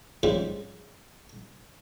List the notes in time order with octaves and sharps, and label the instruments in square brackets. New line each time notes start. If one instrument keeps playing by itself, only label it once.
[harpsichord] G#2 C#3 F3 G3